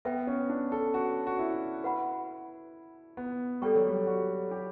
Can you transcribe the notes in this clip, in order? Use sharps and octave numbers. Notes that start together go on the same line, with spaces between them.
B3 B4 E5 G5
C#4
D4
A4
F#4
F#4
E4
F#4 B4 F#5 B5
B3
G3 A4 D5 G5 C#6
F#3
G3
F#4
G4